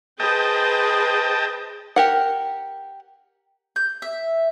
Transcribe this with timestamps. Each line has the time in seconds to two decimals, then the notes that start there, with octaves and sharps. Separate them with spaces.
0.20 G#4 B4 C5 D#5 G5 A5
1.96 G4 A#4 F#5
3.76 G6
4.02 E5